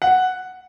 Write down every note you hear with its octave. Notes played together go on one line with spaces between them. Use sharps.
F#5